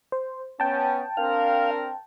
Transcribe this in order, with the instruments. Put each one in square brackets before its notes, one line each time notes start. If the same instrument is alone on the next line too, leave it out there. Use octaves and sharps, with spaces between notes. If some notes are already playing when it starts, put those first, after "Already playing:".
[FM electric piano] C5
[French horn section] B3 C#4 [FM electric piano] G5 A5
[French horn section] C4 D4 A#4 [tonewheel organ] F5